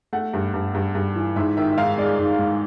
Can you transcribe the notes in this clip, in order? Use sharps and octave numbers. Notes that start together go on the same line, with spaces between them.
A3 F#5
G2
G2
G2
G2
E3
G#2 E5
D#3 E5
E5
G#2 F5
G#3 D5
G#2
G#2